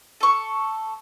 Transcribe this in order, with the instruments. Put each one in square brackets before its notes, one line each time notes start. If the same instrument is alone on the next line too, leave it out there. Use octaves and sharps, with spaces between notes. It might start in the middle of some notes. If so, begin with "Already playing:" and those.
[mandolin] A4 C#6